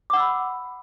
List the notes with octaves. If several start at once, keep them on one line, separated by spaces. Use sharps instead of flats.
F#5 B5 D6 E6